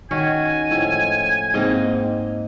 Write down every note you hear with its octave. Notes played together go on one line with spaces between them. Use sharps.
D#3 C#4 F#4 G#5
A2 F3 G#3
G#2 A#3 C4 D#5